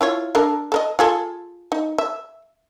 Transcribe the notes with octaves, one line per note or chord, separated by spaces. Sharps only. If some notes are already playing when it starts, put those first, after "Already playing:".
E4 F4 C#5
D4 A4 A#4
A4 A#4 D#5
F4 G#4 A4
D#4
E5